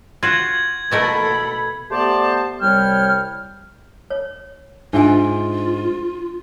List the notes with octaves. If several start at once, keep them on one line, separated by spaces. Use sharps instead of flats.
F4 F#4 G#6 F#7
B2 A3 A4 A#4 B5
A3 B3 G4 C5 D5 A5
C2 G3 C#5 G5 F6
C#5
G#2 D4 F4 E5 G#5